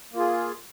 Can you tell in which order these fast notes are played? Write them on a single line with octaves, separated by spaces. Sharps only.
A#3 F4 G#4